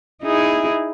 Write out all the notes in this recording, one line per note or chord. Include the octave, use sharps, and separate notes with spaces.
D#4 E4 G#4